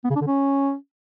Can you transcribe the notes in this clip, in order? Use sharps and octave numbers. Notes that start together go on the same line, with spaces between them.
B3
C#3
D4
D3
C#4